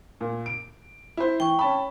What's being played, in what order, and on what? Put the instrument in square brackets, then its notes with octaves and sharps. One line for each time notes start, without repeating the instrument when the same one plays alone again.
[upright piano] A#2
D7
E4 C5
[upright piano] E3 [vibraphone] G5 C#6
[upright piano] C#4 A5 B5